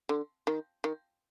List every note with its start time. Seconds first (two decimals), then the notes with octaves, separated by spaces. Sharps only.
0.09 D3
0.47 D#3
0.84 D#3